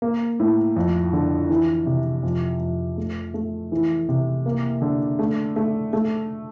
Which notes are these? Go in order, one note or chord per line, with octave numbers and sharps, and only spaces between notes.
A#3
A2
F2
D3
E3
C3
F2
F2
A3
A3
E3
C3
A#3
D3
A3
A3
A3